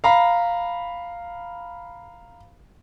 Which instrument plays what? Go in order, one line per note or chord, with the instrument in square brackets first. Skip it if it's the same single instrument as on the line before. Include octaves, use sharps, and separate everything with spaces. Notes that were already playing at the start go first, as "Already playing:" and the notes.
[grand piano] F5 A#5 B5